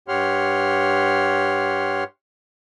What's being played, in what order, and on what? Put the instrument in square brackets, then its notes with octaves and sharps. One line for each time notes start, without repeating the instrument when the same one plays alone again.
[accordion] G2 G4 C#5 F#5 C6 F6